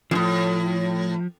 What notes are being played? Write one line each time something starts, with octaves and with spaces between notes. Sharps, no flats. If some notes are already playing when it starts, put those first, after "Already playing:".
F2 A2 F3